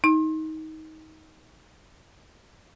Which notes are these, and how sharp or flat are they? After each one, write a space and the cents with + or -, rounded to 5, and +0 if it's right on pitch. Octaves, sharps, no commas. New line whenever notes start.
D#4 +20